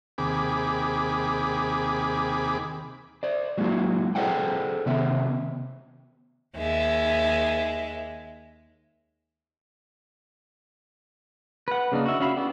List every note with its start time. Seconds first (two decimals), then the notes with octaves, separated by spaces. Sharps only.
0.18 D#2 C3 G#4 B5 D6
3.23 C5 D5
3.58 F#3 G#3 A#3 E4 F#4
4.15 G#4 A4 C5 D5 F#5 G5
4.86 C3 D#3 B3 E5
6.57 D#2 G#3 E5
11.68 B4 F#5
11.92 C#3 A#3 D4 D#4
12.06 F#4 E5
12.20 C#4 F#4 E5 F5 B5
12.37 B3 E4 F#4 G4 D5